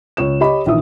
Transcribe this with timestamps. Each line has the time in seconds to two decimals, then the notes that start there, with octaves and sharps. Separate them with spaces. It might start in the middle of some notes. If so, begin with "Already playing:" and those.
0.17 C#2 C#5 E7
0.41 G4 C#5 D#5 B5
0.66 A#1 D#3 E3 E5 D#6